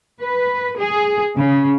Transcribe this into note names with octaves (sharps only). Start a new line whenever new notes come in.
B4
G#4
C#3